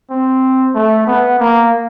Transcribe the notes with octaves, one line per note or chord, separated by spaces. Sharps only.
C4
A3
B3
A#3